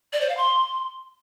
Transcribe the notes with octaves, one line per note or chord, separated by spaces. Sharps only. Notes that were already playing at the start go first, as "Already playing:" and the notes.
D5
C5
F5
C6